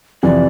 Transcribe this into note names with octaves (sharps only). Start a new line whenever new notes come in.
F2 C3 E3 D5